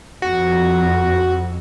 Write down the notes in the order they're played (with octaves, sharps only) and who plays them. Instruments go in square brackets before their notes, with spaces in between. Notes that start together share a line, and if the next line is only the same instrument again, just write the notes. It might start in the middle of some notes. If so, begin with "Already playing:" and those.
[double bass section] F2 [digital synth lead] F#4